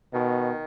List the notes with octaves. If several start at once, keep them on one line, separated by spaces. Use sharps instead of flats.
B2 D#3